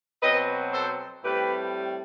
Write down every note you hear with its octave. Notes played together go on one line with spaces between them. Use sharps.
B2 F#3 C4 B4 D#5
A4 C5
A2 G3 C4 G4 B4